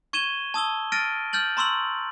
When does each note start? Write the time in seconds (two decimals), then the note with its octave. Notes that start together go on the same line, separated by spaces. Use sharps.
0.13 C#6 G#6 D#7 E7 G7
0.54 A5 D#6 E6 G7
0.92 F6 A6 A#6 D7 D#7
1.33 F6 G6 A6 F#7
1.57 A#5 C6 C#6 E6 F#7